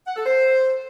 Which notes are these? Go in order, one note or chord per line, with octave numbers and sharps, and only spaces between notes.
F#5
A4
C5